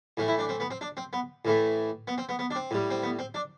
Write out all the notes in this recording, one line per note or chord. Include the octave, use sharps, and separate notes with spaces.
A2 E3 A3
E4
D4
C4
B3
C4
D4
C4
B3
A2 E3 A3
B3
C4
B3
B3
D4
C4
A2 G3
C4
B3
C4
D4